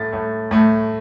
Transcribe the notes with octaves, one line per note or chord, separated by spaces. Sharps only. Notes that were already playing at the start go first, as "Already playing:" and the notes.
Already playing: A2 A3 A6
A2 A3
A2 A3